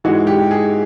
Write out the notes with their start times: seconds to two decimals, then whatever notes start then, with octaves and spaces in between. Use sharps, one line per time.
0.04 G#2 E3 G#3 F#4
0.27 G4
0.51 G#4